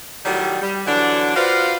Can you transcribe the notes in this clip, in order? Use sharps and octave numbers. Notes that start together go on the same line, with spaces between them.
A2 D#3 F#3 G3
G3
D3 E3 F#3 D4
F4 F#4 B4 C5 D5 F5